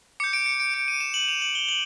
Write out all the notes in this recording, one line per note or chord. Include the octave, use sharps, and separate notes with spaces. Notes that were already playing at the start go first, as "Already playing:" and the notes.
D6 G6 C#7
D7
C#7
D7
D7
D#7
E7
F#7
F7
F#7
G7
F#7